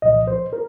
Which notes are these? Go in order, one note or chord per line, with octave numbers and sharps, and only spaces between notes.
C2 A#2 F3 D#5
C5
A#4